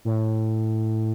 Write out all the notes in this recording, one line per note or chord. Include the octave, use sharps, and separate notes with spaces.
A2